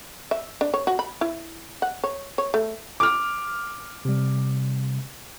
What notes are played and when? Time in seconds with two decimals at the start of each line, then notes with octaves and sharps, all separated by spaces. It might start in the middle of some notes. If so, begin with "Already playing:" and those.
0.31 E5
0.61 D4
0.74 C#5
0.87 F#4
0.99 B5
1.21 E4
1.82 F#5
2.04 C#5
2.38 C#5
2.54 A3
3.00 D6 F6
4.05 C3 G3